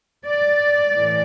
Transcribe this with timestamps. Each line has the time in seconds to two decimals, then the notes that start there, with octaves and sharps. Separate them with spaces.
0.26 D5
0.93 A2 E3